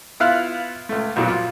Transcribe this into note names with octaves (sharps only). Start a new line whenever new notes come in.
B3 E4 F4 F5 F6 F#6
C#2 A3
B1 F2 A#2 F#3 B3
F4